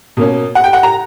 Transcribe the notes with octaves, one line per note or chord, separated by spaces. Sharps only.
B2 A#3 C#4
F#5
G5
F#5
A#5